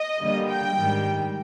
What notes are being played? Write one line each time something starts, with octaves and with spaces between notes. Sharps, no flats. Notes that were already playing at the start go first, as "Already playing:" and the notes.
Already playing: D#5
D3 G3 A#3
G5
G#2 D#3 G3